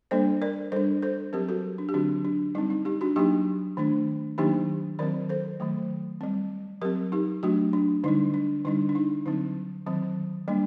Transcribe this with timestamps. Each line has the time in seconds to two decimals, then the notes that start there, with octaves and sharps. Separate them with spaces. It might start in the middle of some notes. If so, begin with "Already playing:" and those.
0.11 G3 A#3 D4 A4 C5
0.42 A#4 D5
0.72 G3 D4 A4 C5
1.02 A4 C5
1.33 F#3 C4 G4 A#4
1.48 F#4 A4
1.78 D4
1.89 G4
1.94 D3 F#3 C4 D4 F#4
2.25 D4
2.55 G3 C4 D#4
2.70 D#4
2.85 D#4 G4
3.01 D4 F#4
3.16 F#3 A#3 D4 D#4 G4
3.77 D#3 A3 D4
4.38 D#3 F#3 A#3 D4 D#4 G4
4.99 D#3 F#3 C4 A#4 D5
5.29 A4 C5
5.60 D#3 F#3 A3
6.21 G3 C4
6.82 F#3 C4 G4 A#4
7.12 D#4 G4
7.43 F#3 A3 D4 F#4
7.73 D4
8.04 D3 G3 D4 D#4
8.34 D4
8.65 D3 G3 D4 D#4
8.89 D4
8.95 D#4
9.26 D3 F#3 C4 D#4
9.86 D#3 F#3 C4
10.48 G3 A#3 D4